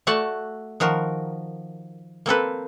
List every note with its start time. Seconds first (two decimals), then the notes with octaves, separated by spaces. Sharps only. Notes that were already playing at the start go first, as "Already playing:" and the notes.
0.07 A3 F#4 D5 F#5 A5
0.80 D#3 F3 F#4 A#4
2.26 A#3 C4 A4 B4